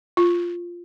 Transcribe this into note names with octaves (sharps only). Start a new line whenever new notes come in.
F4